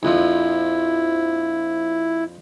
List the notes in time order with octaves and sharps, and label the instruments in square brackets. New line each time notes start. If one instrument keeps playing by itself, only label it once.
[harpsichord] A#1 F2 F3 [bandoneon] E4